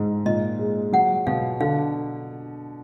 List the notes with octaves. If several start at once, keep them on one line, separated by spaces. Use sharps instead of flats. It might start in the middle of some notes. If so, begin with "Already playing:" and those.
Already playing: G#2 G#3
A#2 D#5
G#3
F#3 F#5
B2 F5
D3 F5